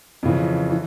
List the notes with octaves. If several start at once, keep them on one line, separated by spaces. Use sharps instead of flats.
F2 C#3 E3
E3